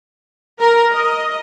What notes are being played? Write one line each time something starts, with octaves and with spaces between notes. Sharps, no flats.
A#4
D#5